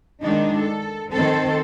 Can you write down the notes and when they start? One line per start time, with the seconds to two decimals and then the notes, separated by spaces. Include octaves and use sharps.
0.22 D#3 G#3 D4 D#4
0.59 A4
1.12 D#3 C4 A4 C5